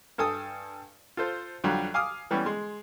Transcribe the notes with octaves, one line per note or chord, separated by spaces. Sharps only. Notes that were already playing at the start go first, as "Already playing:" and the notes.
G2 A4 G#5 D#6
F4 A4 C5
F2 D3 F#3 G3
F5 G#5 D6 D#6 F6
E3 G3 B3 C#4
G#3 C6